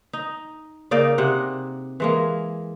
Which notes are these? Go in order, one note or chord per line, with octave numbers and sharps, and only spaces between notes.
D#4
C#3 A#3 D#4 D5
C3 G#4 F#5
E3 G#3 A#3